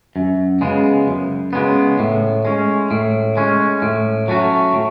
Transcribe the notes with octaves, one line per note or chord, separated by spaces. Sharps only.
F#2
C#3 G#3 B3
F#2
C#3 G#3 B3
A2
G#3 C#4
A2
G#3 C#4
A2
F#3 A3 C#4 F#4
A2